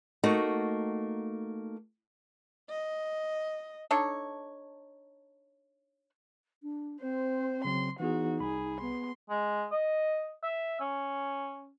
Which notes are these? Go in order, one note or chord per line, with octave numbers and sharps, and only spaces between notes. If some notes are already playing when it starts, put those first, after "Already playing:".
A3 A#3 D#4 F#4
D#5
D4 D#4 A4 C#5
D4
C4 C5
C#3 F#3 C4 C6
E3 B3 D#4 F#4 G#4
C2 G#4 B5
B3 C6
G#3
D#5
E5
C#4